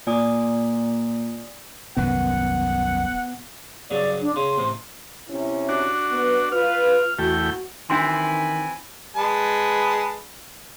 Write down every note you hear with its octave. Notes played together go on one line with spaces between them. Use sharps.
A#2 D5 G#5 D#6
E1 C2 F#2 D#3 B3 F#5
G2 C#3 F#3 D5
D4
C#3 C6
A1 C3
C3 C#4 E4
D4 F#4
B3
F4 B4 F6
E2 A3 F#4 G5
D#3 E3 C4 D4 E4 F#4 G#5 C6
G#3 B4 A5